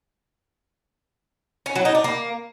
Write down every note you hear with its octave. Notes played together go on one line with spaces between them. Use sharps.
C#4
F#3
D#4
D4
A#3